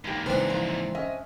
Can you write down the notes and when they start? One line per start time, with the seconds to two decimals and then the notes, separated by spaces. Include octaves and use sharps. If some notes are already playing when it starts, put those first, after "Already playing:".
0.04 E2 G#2 A#3 G4
0.26 C#3 E3 G#3 C4 D4 E4 G#4 B4
0.50 F3 E4 A#5
0.95 C#4 D#5 E5